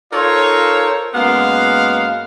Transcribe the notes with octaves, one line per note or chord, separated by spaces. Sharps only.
D#4 F4 A4 A#4 C5 C#5
F#2 G#3 A#3 B3 F5